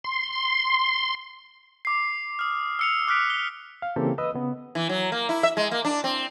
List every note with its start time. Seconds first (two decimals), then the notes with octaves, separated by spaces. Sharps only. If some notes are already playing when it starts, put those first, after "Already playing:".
0.04 C6
1.85 D6 C7
2.39 D#6 F6
2.79 E6 C#7 F7
3.07 D6 F6 F#6 B6 D7
3.30 G7
3.82 F5
3.96 C#3 E3 A#3 C4 G4 A4
4.18 B4 D#5 D#6 E6
4.34 C#3 B3
4.75 E3
4.89 F#3
5.12 A#3
5.29 E4
5.43 E5
5.57 G#3
5.71 A#3
5.85 D4
6.04 C4